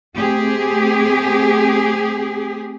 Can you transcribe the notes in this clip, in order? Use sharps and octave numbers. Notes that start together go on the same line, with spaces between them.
A3 C4 G4 G#4